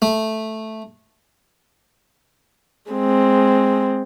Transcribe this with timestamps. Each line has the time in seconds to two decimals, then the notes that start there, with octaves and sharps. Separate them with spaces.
0.02 A3
2.91 G#3 C4